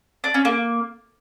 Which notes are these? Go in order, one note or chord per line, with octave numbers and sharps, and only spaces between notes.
D4
C#4
A#3